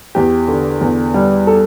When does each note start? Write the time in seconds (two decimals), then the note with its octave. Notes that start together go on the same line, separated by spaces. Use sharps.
0.15 E2 G4
0.48 D3
0.81 E2
1.14 G3
1.47 A4